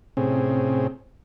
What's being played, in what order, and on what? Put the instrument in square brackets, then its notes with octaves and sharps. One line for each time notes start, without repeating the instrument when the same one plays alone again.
[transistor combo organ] A2 C3 C4 C#4 G#4